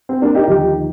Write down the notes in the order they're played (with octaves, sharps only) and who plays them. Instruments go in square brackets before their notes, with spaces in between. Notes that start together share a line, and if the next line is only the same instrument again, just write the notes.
[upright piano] C4
A#3 D4
D#4 G4
D#2 D3 F3 D#4 G4